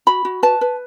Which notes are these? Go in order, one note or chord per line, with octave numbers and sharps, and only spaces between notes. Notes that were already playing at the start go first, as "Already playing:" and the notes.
F#4 B5
F#4
B4 A5
B4